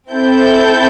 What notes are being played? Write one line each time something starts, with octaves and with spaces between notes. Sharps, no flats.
C4 E4 A4 G6